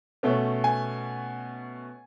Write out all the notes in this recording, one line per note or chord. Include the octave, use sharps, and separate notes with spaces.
B2 A3 C#4
G#5